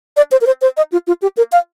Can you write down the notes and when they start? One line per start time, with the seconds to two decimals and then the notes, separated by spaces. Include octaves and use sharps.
0.17 D5
0.32 C5
0.41 A#4
0.47 C5
0.62 C5
0.77 D#5
0.92 F4
1.07 F4
1.22 G4
1.37 A#4
1.52 F5